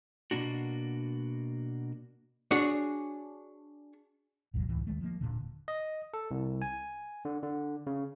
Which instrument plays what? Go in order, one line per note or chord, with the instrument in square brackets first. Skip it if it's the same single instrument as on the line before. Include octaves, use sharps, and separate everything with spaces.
[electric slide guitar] B2 A#3 D4 F#4
[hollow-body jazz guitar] D4 F#4 G#4 C#5
[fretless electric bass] G#1 D#2 B2 F#3
C#2 A2 E3
D2 D#3 G#3 A3
F3 A#3
D#1 A#2 D3
[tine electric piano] D#5
A4
C2
G#5
D3
D3
C#3